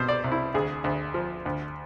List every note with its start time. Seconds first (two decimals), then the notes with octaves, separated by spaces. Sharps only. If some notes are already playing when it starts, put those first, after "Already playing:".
Already playing: C2 B2 C5
0.09 D5
0.24 C2
0.32 E4
0.54 D2 G#4
0.84 D2
1.14 F3
1.46 D2